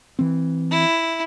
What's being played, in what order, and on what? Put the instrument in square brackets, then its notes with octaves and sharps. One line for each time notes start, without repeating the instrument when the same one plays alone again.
[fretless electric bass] E3 C4
[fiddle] E4